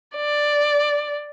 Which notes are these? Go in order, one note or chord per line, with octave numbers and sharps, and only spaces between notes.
D5